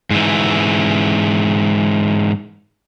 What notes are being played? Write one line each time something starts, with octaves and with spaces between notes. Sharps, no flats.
G#2 E3